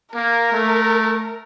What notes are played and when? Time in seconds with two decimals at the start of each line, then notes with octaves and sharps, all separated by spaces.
0.15 A#3 A#4
0.52 A3